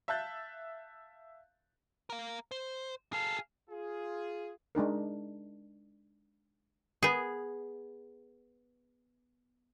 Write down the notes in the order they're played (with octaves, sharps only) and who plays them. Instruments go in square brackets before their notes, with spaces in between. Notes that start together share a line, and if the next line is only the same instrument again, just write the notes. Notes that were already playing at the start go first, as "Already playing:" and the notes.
[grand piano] E5 F5 A5 F#6 G6 A6
[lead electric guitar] A#4 F5
C5
[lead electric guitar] G#4 A4 [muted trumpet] F5
[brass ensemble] F4 G#4
[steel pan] G#3 D4 D#4 A#4
[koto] B3 G#4